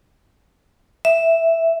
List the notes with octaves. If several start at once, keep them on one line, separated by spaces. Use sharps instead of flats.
E5